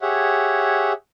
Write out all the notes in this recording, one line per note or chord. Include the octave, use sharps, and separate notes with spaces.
G4 G#4 C#5 E5 F#5